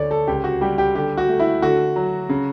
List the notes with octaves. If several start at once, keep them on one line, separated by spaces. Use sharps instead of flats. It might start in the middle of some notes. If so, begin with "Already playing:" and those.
Already playing: D2 D3 C#5 D5
A4
C#2 G4
F#4
G3 G4
G4
D3 G4
F#4
A3
E4
D3 F#4
F#3
C#3